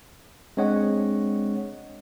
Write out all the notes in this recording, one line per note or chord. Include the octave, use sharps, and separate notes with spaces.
G#3 C4 D4 C#5 D#5 F#5